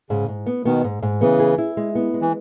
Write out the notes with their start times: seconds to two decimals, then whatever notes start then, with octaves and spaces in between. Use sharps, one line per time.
0.10 G#2 C#3
0.28 G#2
0.46 B3
0.65 B2 D#3 B3
0.84 G#2
1.03 G#2
1.21 C#3 E3 B3
1.40 G#4
1.58 E4
1.77 G#3
1.95 B3
2.14 G#3
2.21 E3